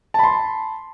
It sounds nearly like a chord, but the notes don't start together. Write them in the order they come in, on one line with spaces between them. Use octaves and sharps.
A5 B5 C6